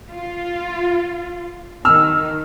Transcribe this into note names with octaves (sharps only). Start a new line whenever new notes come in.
F4
D#3 E6 F6